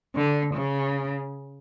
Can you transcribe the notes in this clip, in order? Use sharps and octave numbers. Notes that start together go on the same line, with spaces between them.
D3
C#3